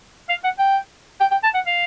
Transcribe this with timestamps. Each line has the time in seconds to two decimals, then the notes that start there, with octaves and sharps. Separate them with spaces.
0.29 F5
0.44 F#5
0.59 G5
1.20 G5
1.31 G5
1.43 A5
1.54 F#5
1.67 F5